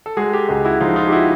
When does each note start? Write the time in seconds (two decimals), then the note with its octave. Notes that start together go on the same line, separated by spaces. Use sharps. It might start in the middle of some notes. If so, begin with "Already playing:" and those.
0.06 A4
0.17 G#3 F#4 G#4
0.33 G4 A4
0.49 C#2 F#4 G#4
0.65 E4 F#4
0.80 F3 D#4 F4
0.96 D#4 F4
1.07 G4
1.12 E4 F#4